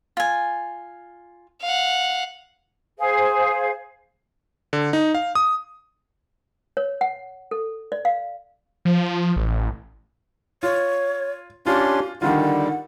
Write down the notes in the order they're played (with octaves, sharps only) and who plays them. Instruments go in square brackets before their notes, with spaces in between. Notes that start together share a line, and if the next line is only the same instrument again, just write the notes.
[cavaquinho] F4 G#5
[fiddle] F5 F#5
[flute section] G#4 C5 F5
[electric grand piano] D3
D#4
F5
D#6
[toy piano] C#5
F#5
A4
D5
F5
[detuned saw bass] F3
A1
[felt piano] F4 [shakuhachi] C#5
[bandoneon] C#4 D4 C6 [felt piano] F4 [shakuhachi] G4
[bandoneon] D3 G3 [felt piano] D#3 D4 F4 [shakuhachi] F#5